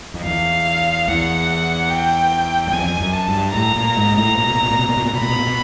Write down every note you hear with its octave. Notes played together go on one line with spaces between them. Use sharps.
F2
E2 F5
E2 F#5
G5
F#2
F2 G#5
F#2
A5
G2
A2 A#5
A#2
G#2
A#2
A2
A#2
B2
A#2
B2
A#2
B2
A#2
B2
A#2
B2
A#2 B5
B2
A#2
B2